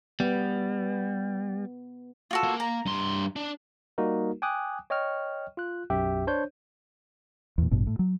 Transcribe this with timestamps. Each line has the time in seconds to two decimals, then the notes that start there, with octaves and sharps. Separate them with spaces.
0.20 G3 B3
2.31 F4 F#4 A4
2.44 A#3
2.60 A#5
2.86 G2 C6
3.36 D4
3.98 G3 A#3 D#4 F#4 A#4
4.42 G5 G#5 D6 D#6 F#6
4.90 C#5 D#5 G5 C#6 F6
5.57 F4 F#6
5.90 B1 F#2 G4 E5 G5
6.27 D4 C5 C#5 G6
7.58 E2 A#2
7.71 A1 G2 B2
7.87 A2
7.99 F#3